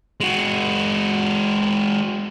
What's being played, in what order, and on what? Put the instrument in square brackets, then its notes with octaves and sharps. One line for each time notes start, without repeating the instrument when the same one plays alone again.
[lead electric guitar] G#3 F#4